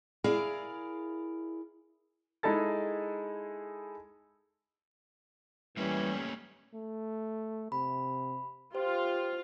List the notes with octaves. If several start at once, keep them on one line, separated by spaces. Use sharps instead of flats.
E4 G#4 A#4 D5 F5
G#3 D#4 E4 G#4 A4 A6
E3 G3 A3 A#3 C#4 G4
A3
C3 B5
F4 G4 C5